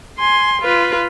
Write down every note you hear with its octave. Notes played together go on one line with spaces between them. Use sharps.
G#5 C6
F4 B4